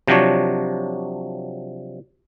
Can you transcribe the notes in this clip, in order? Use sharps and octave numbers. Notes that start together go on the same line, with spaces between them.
C3 F3 F#3 D4 C#5